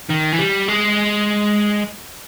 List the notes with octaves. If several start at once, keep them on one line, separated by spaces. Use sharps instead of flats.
D#3
E3
G3
G#3